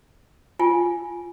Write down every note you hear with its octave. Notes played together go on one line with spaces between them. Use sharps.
F4 G#5